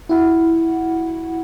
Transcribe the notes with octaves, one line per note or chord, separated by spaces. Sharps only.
E4 F#4 F#5